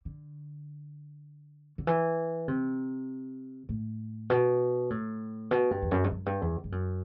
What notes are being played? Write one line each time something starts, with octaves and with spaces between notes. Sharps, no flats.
D3
D3
E3
C3
A2
B2
A2
B2
G2
E2
F#2
G2
F#2
G2
E2
G2
F#2